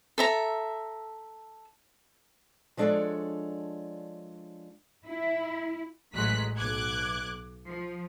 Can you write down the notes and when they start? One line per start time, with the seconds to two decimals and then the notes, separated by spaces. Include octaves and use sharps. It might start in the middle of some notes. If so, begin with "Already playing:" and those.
0.18 A4 E5 A#5
2.77 F3 G#3 D4 A4 C#5 D5
5.06 E4
6.14 A1 F#3 G#3 F#6 B6
6.58 B1 D6 F#6 G#6
7.68 F3